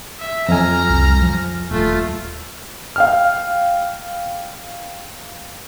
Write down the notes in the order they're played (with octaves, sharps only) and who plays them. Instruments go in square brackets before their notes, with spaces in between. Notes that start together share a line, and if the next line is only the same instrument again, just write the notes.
[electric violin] E5
[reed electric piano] F2 G#5 [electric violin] A#5 F6
[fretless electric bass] C2
F3
[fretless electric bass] D#1 [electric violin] A3 F4
[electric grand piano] F5 G5 F6